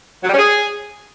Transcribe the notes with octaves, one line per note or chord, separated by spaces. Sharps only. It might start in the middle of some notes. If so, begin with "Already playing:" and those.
F#3
G3
C#4
G#4